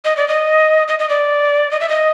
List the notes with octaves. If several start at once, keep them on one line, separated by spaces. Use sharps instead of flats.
D#5
D5
D#5
D#5
D#5
D5
D#5
E5
D#5